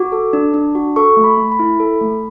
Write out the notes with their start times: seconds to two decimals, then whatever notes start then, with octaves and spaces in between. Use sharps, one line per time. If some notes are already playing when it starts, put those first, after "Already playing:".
Already playing: F#4 D6
0.12 A4
0.33 D4
0.54 D4
0.75 F#4
0.96 A4 C#6
1.17 A3
1.24 B5
1.37 A3
1.52 B5
1.59 E4
1.80 A4
2.01 A3